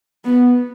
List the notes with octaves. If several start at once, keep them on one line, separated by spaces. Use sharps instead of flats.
B3